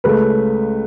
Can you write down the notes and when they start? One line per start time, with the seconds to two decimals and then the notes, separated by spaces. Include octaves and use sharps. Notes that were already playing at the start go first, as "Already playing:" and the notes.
0.04 C#2 C#3 A3 B4